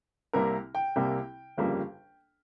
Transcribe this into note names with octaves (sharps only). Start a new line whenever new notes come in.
C2 C3 G3 A#3 A#4
G5
C2 C3 G3 A#3
G1 F2 C#3 G3 A#3